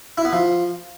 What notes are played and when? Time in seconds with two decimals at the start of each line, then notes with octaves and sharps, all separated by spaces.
0.18 E4
0.25 B3
0.33 F3